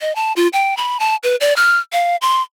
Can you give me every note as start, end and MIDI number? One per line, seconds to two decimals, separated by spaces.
0.01 0.15 75
0.16 0.33 81
0.36 0.48 65
0.53 0.76 79
0.77 0.98 83
1.00 1.16 81
1.23 1.36 71
1.41 1.55 74
1.56 1.79 89
1.93 2.16 77
2.22 2.41 84